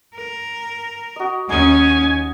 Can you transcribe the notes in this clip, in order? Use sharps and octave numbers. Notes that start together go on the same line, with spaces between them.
A#4
F#4 D#5
D#2 C#4 D#4 G#5 D#6